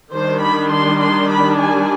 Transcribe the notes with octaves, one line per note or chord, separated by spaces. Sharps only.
D#3 G3 D4 C5
B5
C6
C6
B5
G#5